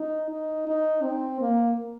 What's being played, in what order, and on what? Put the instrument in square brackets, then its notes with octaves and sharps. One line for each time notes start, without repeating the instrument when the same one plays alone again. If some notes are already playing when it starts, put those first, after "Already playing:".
Already playing: [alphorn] D#4
D#4
D#4
C4
A#3